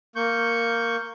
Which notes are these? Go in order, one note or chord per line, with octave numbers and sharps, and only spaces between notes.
A#3 C#6 G6